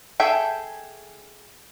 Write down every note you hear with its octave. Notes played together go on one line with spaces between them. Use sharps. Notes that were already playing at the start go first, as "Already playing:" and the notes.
G#4 A4 E5 G5